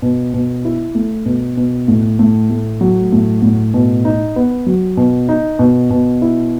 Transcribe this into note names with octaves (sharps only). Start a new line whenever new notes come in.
B2
B2
E4
A3
B2
B2
A2
A2
A3
F#3
A2
A2
B2
D#4
B3
F#3
B2
D#4
B2
B2
E4